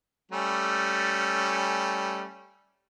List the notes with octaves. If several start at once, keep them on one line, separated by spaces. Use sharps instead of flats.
G3 A3 C#4